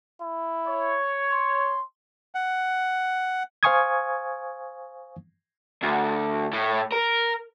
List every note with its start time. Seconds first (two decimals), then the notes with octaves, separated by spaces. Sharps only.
0.22 E4
0.67 C#5
1.32 C6
2.35 F#5
3.63 C5 F5 G#5 C#6 D#6 G#6
5.83 D2
6.53 A2
6.92 A#4